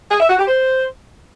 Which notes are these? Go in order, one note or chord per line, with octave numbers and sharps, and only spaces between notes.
G#4
E5
F#4
G4
C5